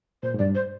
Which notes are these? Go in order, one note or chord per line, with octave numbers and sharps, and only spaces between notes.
A#2 C5
G#2
G2 D5
C5